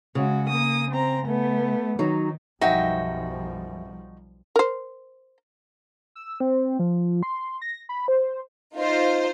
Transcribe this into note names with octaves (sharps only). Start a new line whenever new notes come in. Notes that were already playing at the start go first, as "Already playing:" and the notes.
C#3 G#3 F#4
A#3 D#6
C4 A#5
A3 B3
D#3 F#3 D#4
B1 F#2 F3 G3 D#4 F#4 E5 G5
A#4 C5
E6
C4
F3
C6
A#6
B5
C5
D#4 F4 C5